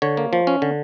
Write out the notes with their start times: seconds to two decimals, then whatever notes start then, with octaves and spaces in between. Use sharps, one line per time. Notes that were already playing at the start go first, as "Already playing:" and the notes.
0.02 D3 C#5
0.17 A#3
0.33 F3
0.47 C#4
0.62 D3